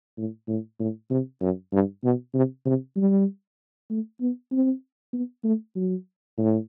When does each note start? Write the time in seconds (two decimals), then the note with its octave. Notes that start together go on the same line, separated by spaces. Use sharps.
0.18 A2
0.48 A2
0.80 A2
1.10 C3
1.41 F#2
1.72 G2
2.04 B2
2.34 C3
2.66 C3
2.96 G3
3.90 A3
4.21 B3
4.52 C4
5.13 B3
5.44 A3
5.76 F#3
6.38 A2